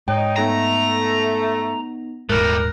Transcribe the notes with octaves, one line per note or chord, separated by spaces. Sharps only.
G#2 D#4 C#5 G5
A3 B3 D#4 A#5 A#6
D#1 G#2 G3 A3 A#4 F#6